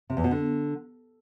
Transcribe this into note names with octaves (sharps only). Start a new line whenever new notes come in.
C3
E2
B2
D3